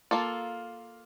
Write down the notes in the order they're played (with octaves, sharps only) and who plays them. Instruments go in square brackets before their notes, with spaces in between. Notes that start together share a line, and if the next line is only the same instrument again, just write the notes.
[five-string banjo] A#3 F4 A4